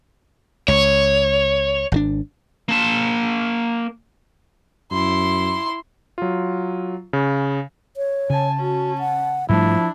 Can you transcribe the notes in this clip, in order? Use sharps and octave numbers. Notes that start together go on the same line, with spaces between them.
C#2 C#5
G#1 C3 D4
A#3 A5
F#2 E4 C6
F#3 F4
C#3
C#5
C#3 G#5 A5
C#4 F#4 A5
F#5
G#2 F3 G3 A3 D4 E4